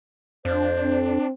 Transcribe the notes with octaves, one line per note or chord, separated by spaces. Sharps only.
F2 D4 C5
C4